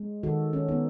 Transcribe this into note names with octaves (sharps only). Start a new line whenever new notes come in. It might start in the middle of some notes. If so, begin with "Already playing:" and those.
Already playing: G#3
D#3 F#4 A4
D#3 C#4
B3 D#4